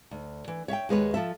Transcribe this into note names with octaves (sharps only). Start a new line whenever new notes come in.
D2
E3
C#5 E5 F5 G5
D#2 G#3 B4 C#5
F3 A4 E5